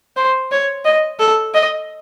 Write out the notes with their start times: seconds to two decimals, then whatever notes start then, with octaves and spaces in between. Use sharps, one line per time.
0.16 C5
0.51 C#5
0.85 D#5
1.20 A4
1.54 D#5